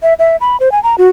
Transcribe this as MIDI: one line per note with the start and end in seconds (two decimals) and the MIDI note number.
0.03 0.14 76
0.19 0.36 76
0.41 0.57 83
0.60 0.71 72
0.72 0.82 80
0.83 0.96 82
0.98 1.09 66